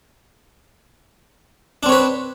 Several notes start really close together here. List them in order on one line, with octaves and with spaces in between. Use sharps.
D4 C4 C#5 B4